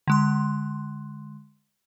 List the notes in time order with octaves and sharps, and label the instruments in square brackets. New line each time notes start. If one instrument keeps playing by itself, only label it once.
[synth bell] D3 G#3 C6